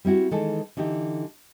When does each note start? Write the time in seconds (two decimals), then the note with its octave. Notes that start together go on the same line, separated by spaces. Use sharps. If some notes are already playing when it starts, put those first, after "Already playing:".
0.05 G3 C4 E4 F#4
0.31 D#3 E3 G#3 G#4 A4
0.77 D3 E3 D#4 G4 A4